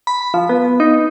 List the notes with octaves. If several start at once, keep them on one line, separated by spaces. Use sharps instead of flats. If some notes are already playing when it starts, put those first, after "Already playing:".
B5
F3
B3
D#4